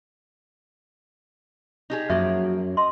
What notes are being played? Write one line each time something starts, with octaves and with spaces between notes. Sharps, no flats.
D#4 G4 G#4
F#2 F3 A#3 F#4 G#4 E5
D#5 C6